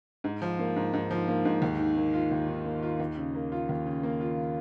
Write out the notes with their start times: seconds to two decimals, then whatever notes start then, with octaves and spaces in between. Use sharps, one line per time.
0.24 G#2
0.42 F3
0.59 A#3
0.76 G#2
0.93 G#2
1.11 F3
1.28 A#3
1.45 G#2
1.62 D#2
1.79 D#3
1.97 A#3
2.14 F4
2.31 D#2
2.48 D#3
2.65 A#3
2.83 F4
3.00 D#2
3.17 C#3
3.35 A#3
3.52 F4
3.69 D#2
3.86 C#3
4.03 A#3
4.21 F4